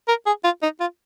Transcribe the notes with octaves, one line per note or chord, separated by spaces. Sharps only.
A#4
G#4
F4
D#4
F4